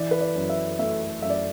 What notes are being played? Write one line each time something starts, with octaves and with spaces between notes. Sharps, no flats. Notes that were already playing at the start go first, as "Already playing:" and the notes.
Already playing: E3 D5
B4
D5
F#2
E5
A3 E5
F#2 E5
D5